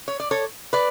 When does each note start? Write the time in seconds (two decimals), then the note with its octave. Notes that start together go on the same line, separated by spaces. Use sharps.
0.08 C#5
0.20 D5
0.31 A4 C#5
0.73 B4 D5